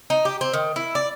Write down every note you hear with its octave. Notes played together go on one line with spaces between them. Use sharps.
D#4
G4
C4
D#3
E4
D5